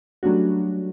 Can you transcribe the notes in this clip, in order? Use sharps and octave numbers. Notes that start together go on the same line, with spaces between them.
F#3 G3 A3 C#4 D4 F#4